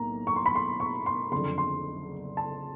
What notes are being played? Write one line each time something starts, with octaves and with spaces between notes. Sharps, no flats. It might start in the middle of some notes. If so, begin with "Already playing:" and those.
Already playing: B1 A2 A#3 A#5
C#6
C6
B5
C6
C#6
C6
F#1 F2 D3 C6
C6
A5